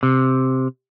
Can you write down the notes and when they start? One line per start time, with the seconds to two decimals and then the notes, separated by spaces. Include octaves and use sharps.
0.03 C3